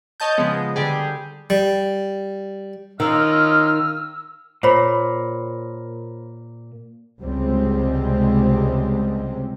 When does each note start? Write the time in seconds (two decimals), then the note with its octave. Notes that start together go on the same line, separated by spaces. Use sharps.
0.20 C#5 D#5 A5 G6
0.38 C#3 F3 G#3 B3
0.76 D3 G3 G4 G#4
1.50 G3
3.00 D#3 C#4 F4 D#5 E6 F6
4.63 A#2 C5 C#5 B5
7.21 C#2 C3 G3 G#3 C4